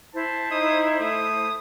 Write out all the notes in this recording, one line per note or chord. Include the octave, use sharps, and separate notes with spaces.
E4 C5 A5
D#4 D#6
A3 D#6